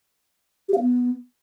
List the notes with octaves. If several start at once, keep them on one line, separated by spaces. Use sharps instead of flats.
G4
F5
B3